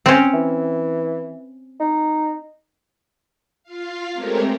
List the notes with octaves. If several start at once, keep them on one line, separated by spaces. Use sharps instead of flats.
C4 C#4
E3
D#4
F4 F5
G#3 A3 C4 G4 A#4 C#5